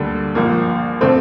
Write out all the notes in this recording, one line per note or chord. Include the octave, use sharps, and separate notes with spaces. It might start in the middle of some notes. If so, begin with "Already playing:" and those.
Already playing: D2 D3 G3 A#3 D4
A#1 A#2 F3 A#3
D3 A3 C4